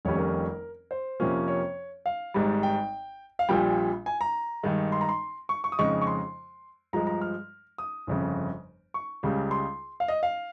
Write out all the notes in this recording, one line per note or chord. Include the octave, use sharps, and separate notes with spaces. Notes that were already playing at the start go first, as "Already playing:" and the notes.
F1 F2 D#3 G3 C#4 C#5
A#4
C5
F2 C3 F3 A#3 C#4
C#5
F5
G#1 G#2 G3
G5
F5
A#1 A#2 G3 G5
G#5
A#5
G2 D#3 G#3
C6
A#5
C6
C#6
C#6
D#6
F2 C#3 G#3 D#4 C#6
C#6
C6
G2 F3 G#3 A#5
A#5
F6
D#6
G1 F2 C#3
C#6
C#2 C#3 G3
C6
F5
D#5
F5